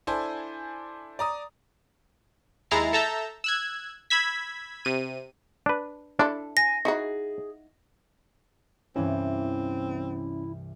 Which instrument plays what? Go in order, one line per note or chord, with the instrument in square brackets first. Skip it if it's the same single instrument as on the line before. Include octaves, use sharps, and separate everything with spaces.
[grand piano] D4 E4 A4 C5 G#5
D5 A#5 D#6
[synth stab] D#2 G#3 E4 A#5 A6 C7
A4 E5 A5 A#5 E6 G6
E6 F#6 G#6
B5 E6 G#6 B6
C3 D#7
[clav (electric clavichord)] D4 B4
[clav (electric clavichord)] D4 [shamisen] E4 A4
[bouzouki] G#5 [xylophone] A#6
[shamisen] D#4 E4 F#4 [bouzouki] G#4
[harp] C2 G2 E3 [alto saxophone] C4 [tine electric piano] C#4 [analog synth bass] E4